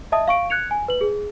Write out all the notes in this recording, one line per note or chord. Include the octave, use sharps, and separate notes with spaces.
D#5 E5 A5 D#6
F5 C#6 D7
F#6 G#6 C#7 F7
G#5
B4 F#7
G#4